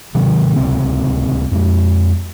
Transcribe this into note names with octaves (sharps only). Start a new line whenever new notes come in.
C3 D#3 F#3
D1 C#2 C3 C4
F2 G#3